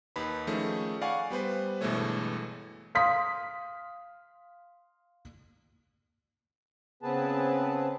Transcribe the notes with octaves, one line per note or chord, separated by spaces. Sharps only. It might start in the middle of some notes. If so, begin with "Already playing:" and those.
D#2 D#4 B4 B5
D#3 F3 A3 C#4 D#4 G#4
D5 F5 F#5 G#5 B5 C#6
G3 B3 B4 C5
G1 B2 E3 G#3 A3 C#5
F5 C6 D#6 B6
C#3 B3 C4 G#4 B4 A5